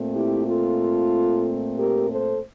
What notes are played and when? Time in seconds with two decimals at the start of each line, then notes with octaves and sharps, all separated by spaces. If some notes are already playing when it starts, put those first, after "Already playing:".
Already playing: A#2 A3 C4
0.15 E4 G4
0.48 F4 A4
1.78 G4 A#4
2.10 A4 C5